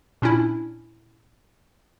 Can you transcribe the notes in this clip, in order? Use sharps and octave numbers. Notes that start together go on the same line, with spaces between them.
A#2 C#4 D4 E4